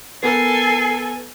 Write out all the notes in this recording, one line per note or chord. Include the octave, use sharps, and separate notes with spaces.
B3 A4 A#4 G#5 C7